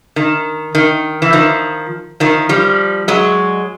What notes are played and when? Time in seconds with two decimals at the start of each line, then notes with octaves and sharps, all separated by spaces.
0.16 D#3
0.75 D#3
1.22 E3
1.33 D#3 F3
2.20 D#3 F3
2.49 F3 G3
3.08 F#3 G#3